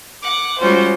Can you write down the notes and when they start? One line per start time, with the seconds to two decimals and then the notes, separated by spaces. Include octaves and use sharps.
0.22 F#5 D6
0.58 G3 G#3 C#4 F4 F#4 C5